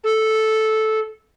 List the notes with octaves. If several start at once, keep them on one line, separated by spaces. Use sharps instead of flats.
A4